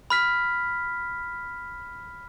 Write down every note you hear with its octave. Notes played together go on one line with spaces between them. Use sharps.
B5 F6 B6